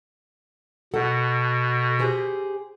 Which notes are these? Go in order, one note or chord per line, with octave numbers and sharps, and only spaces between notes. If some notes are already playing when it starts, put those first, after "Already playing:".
B2 A4 F#5
G4 G#4 C5